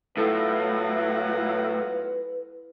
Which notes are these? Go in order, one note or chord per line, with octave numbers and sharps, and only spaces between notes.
A2 F#3 B3 E4 F4 A4 B4